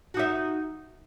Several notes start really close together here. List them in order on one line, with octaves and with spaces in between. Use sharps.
F#4 D#4 E5